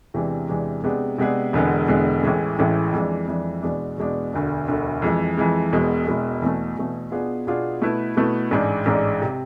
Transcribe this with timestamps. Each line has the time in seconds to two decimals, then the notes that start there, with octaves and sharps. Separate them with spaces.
0.14 E2 C3 E3 G#3 D4
0.48 E2 C3 E3 G#3 D4
0.84 C3 G#3 B3 D4 G#4
1.18 C3 G#3 B3 D4 G#4
1.53 E1 E2 D3 G#3 B3
1.88 E1 E2 D3 G#3 B3
2.23 A1 A2 E3 G#3
2.58 A1 A2 E3 G#3
2.92 F2 E3 G#3 D4
3.28 F2 E3 G#3 D4
3.62 E2 B2 G#3 D4
3.98 E2 B2 G#3 D4
4.33 E1 D2 D3
4.68 E1 D2 D3
5.02 F2 E3 G#3
5.37 F2 E3 G#3
5.72 E1 E2 B2 G#3
6.07 E1 E2 B2 G#3
6.42 E2 B2 A3
6.77 E2 B2 A3
7.11 B2 B3 D4 F4 G#4
7.47 B2 B3 D4 F4 G#4
7.82 B2 A3 E4 B4
8.17 B2 A3 E4 B4
8.51 A1 G#2 G#3 D4
8.86 A1 G#2 G#3 D4
9.22 C3